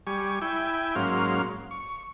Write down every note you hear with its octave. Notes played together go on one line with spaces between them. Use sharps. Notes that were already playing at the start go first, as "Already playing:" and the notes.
G3 G#5 C#6
E4 G5 G#5
G#2 F#3 A#3 C#4 F5 C6
C#6